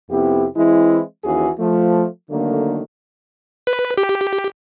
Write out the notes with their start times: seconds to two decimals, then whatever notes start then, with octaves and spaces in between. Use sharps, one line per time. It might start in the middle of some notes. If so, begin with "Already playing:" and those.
0.10 F2 C3 B3 E4 G4
0.56 E3 G#3 C4 E4
1.24 D#2 E3 C#4 F#4 G#4
1.59 F3 A3
2.31 D3 D#3 F#3 A3 A#3
3.67 B4
3.98 G4